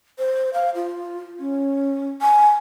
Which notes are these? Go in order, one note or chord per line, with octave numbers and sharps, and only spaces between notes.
C5
F5
F4
C#4
G#5